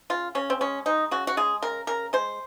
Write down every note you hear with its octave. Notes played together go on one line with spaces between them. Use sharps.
C#3 F4
C#3 C#4
C4
G#3 C#4
G#3 D#4
C#3 F#4
F#4
G#3 G#4
C#3 A#4
C#3 A#4
G#3 C5